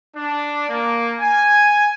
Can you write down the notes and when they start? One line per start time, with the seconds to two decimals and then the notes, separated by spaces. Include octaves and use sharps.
0.16 D4
0.69 A#3
1.20 G#5